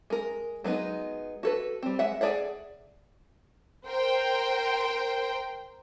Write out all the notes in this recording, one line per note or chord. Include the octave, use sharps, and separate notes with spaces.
G#3 A#4
F#3 G#3 B3 D#4
F#4 A4 B4
G3 C4
G#3 E5 F#5
G#4 A#4 D5 E5 F#5
A#4 C5 G5 C6